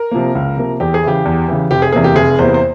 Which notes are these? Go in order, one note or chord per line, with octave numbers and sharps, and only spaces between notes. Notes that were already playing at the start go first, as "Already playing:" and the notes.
Already playing: A#4
C3 F3 A#3
C#2
C3 F3 A#3
E2 G4
G#4
C#3 E3 G4
E2
C#3 E3
F1 G4
G#4
E2 C3 E3 A#3 G#4
G4
F1 G#4
E2 C3 E3 A#3 C5
C5